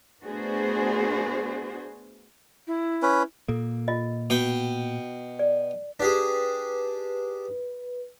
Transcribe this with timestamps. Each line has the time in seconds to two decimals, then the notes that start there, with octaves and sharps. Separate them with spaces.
0.23 A3 B3 D4 F#4 G#4 C5
2.67 E4
3.03 C#4 B4
3.48 A#2 A#3 A4
3.88 F4 D#5
4.30 B2 G5
5.39 D5
6.00 D4 G4 G#4 B4